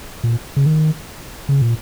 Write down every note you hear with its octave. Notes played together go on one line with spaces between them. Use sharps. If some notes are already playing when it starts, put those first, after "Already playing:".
A#2
C#3
D#3
C#3
A#2